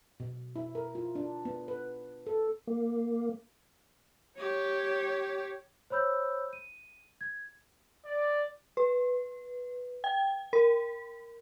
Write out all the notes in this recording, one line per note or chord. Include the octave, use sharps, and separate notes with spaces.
B2
E4
A#4
F4
D4
B3
B4
A4
A#3
G4 C#5
C5 C#5 B5 E6 G6
D#7
G#6
D5
B4
G5
A#4